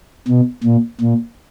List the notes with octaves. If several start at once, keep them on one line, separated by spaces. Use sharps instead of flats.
B2
A#2
A#2